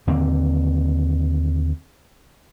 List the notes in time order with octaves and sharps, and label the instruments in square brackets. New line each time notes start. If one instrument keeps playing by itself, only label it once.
[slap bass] D#2 D3 A#3 C4